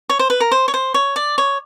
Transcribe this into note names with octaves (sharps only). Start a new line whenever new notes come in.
C#5
C5
B4
A#4
C5
C#5
C5
C#5
D5
C#5